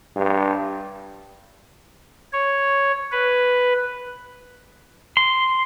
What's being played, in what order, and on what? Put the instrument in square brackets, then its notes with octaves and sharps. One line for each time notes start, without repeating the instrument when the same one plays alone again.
[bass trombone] G2
[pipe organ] C#5
B4
[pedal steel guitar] C6